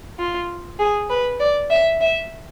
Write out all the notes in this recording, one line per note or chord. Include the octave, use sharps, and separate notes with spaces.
F4
G#4
B4
D5
E5
E5